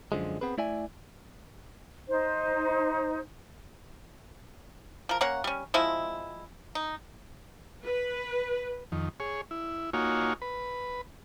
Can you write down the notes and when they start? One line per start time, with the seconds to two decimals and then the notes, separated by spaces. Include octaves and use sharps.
0.12 F#2 D3 F3 G#3
0.41 B3 C4 G#4 B4
0.58 A3 E4 D5 E5 G#5
2.09 D#4 C5
5.09 F3 A#4
5.21 A#3 C#4 C#5 F#5
5.44 G3 C#4
5.74 F3 G#3 C4 E4
6.75 D#4
7.84 B4
8.92 F2 D#3
9.20 G#4 C#5
9.51 E4
9.93 A#3 D#4 F4 F#4 C#5 G#5
10.42 B4